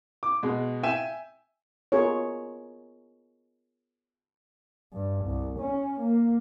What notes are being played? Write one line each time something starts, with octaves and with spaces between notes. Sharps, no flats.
D6
B2 G#3
E5 G5 G#5 E7
B3 F4 G#4 A#4 C#5
G2
C2
C#4
A#3